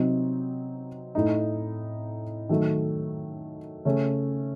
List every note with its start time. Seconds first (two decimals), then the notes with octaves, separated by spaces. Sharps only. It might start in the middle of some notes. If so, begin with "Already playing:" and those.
Already playing: C3 F#3 C4 D#4
1.15 A2 A3 D#4
2.49 D#3 F#3 A3
3.85 C#3 A3 C#4